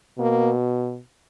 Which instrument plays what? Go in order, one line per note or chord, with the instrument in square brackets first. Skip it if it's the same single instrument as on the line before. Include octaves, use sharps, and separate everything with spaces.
[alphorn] B2 [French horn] A#3